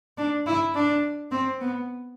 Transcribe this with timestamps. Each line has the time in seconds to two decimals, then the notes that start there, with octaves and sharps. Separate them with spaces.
0.18 D4
0.46 E4
0.75 D4
1.31 C4
1.61 B3